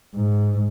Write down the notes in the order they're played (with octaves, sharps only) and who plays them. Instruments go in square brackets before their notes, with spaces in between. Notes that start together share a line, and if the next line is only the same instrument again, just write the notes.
[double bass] G#2